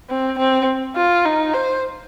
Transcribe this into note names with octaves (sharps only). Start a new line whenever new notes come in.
C4
C4
F4
D#4
C5